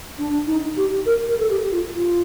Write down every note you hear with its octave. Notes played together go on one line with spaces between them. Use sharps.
D4
D#4
G4
A#4
A#4
A4
G4
F4
F4